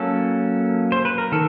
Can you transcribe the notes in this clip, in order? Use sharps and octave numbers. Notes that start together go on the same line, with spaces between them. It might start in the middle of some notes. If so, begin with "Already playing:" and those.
Already playing: F#3 A#3 C#4 A4
C5
B4
A#4
D#3 A4